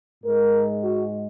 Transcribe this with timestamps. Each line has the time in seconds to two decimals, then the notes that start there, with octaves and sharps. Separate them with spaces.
0.24 G#2 G#3 A#4
0.82 F#4